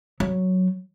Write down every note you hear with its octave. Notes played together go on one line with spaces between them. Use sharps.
F#3